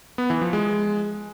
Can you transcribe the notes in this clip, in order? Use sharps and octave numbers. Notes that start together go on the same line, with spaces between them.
B3
E3
F3
G#3